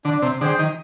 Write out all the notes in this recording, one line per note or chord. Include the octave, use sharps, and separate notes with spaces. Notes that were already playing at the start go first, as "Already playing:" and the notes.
D3 D4
C3
D3 G#4 C5 G5
D#3